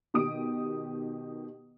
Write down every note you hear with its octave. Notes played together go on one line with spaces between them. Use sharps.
B2 D#3 G4 D#6 D7